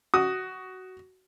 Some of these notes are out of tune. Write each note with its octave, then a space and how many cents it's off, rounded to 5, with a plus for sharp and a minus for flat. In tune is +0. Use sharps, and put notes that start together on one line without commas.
F#4 +10 D#6 +0